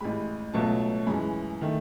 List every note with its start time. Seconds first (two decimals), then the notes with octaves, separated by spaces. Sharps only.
0.01 A1 A2 G#3 B5
0.54 C#2 B2 F#3 A3 A5
1.07 F#2 E3 G#3 B5
1.61 D#3 A3